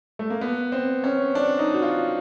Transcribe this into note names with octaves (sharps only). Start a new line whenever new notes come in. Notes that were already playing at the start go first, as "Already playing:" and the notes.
A3
A#3
B3
C4
C#4
D4
D#4
F#4
F4